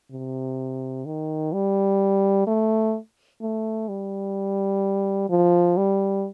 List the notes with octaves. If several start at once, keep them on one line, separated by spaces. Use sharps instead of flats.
C3
D#3
G3
A3
A3
G3
F3
G3